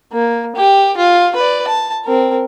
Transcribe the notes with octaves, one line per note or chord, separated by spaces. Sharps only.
A#3
G4
F4
B4 D5
A5
C4 A#4